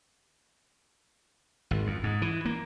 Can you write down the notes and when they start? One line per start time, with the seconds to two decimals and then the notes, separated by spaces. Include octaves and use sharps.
1.71 G#1
1.87 F2
2.04 G#2
2.22 E3
2.45 A#3